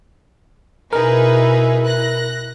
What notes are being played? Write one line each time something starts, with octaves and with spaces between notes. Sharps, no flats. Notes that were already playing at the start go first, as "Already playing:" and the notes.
B2 D#4 E4 G#4 A#4 B4
F#6 A#6